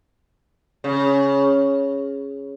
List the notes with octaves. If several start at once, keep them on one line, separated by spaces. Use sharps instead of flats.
C#3